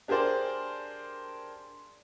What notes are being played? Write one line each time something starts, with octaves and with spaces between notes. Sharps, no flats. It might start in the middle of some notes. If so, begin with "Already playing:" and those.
D4 G4 G#4 A#4 C5 D5